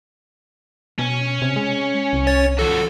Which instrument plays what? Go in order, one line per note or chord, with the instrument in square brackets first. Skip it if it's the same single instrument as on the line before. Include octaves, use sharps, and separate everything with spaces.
[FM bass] B2 [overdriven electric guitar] C#4
[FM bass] C3
G#3
C2
[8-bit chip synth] C#5 A6
[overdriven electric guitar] F3 F#4 [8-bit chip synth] A4